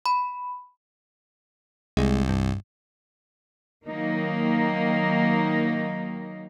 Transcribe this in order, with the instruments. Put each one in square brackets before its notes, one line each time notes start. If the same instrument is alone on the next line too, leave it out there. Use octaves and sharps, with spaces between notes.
[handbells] B5
[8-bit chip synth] C2 [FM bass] G#3
[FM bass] G2
[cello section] D#3 F#3 A#3 D#4